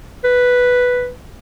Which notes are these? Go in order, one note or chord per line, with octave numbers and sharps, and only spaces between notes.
B4